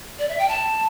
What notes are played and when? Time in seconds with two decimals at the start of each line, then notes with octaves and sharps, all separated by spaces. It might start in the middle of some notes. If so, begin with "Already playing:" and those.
0.19 D5
0.29 E5
0.39 G5
0.48 A5